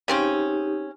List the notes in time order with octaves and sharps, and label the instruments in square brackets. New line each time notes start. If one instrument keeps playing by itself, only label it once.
[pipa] C#3 C4 C#4 [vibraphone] D#4 G4